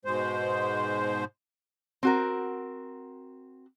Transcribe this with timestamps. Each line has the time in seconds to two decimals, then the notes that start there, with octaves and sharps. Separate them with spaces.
0.05 G#2 B2 G#3 C5
2.03 C4 F#4 A#4